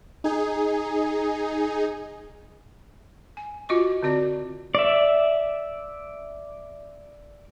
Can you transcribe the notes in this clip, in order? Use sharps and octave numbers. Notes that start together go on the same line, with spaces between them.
D#4 G#4
G#5
F4 F#4 D#5 C#6
D3 C4 F#4 D5
D5 E5